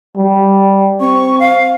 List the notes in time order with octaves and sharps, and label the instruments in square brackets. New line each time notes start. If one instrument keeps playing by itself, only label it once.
[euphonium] G3
[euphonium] C4 [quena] C#6
[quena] F5